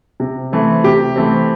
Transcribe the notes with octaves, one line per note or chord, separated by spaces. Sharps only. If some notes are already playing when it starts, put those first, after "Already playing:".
C3
E3 A3 C4
C3 G4
E3 A3 C4